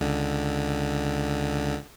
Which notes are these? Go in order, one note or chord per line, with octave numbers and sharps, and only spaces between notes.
C#2 D3